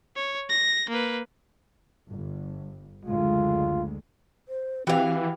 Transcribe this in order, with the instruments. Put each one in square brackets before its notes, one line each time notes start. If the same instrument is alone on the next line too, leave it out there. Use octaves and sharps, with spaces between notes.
[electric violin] C#5
A#6
A#3 B4
[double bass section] G1
[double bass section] F#1 D2 G#3 [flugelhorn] F4
[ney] C5
[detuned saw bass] E3 [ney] C4 [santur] E4 G4 B4 [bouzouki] F#4 F5